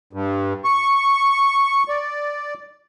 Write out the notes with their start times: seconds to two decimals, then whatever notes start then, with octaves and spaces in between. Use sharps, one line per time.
0.13 G2
0.64 C#6
1.89 D5